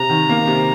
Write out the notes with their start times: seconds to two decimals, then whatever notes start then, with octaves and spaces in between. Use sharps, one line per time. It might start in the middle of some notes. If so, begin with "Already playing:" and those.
Already playing: C3 A#5
0.09 D#3
0.29 A#3
0.47 C3